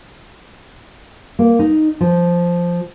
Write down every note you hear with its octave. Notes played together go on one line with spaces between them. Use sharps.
A#3
D#4
F3